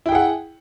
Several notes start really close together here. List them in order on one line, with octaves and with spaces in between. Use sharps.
E4 G5 G#4 F#5